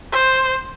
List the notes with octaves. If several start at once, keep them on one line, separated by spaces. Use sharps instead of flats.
C5